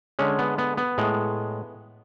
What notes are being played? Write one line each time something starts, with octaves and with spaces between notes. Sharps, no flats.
D3 G#3 C#4
B3
B3
B3
A2 G#3